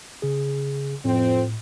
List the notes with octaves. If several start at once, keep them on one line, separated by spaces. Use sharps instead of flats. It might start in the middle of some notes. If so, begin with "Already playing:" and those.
C#3 G#4
F2 A2 C4